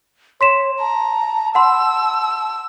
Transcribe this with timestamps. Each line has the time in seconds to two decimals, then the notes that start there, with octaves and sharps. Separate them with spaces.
0.41 C#5 C6 B6 E7
0.80 A5 A#5
1.55 F#5 B5 C6 E6